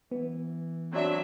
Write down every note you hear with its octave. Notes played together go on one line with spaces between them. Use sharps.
E3 B3
F#3 C4 D4 E5